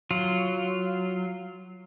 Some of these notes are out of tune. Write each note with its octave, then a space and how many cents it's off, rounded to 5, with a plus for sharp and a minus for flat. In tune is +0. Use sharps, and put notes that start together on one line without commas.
F#3 +0 F4 -5